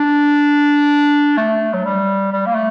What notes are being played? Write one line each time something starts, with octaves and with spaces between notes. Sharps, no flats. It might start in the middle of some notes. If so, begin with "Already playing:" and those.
Already playing: D4
A3
F#3
G3
G3
A#3
A3